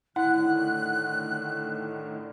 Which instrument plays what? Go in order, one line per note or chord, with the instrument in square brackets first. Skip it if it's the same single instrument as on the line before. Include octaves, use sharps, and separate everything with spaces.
[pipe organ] A2 D3 D#3 [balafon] E4 [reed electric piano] F#5 [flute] F#6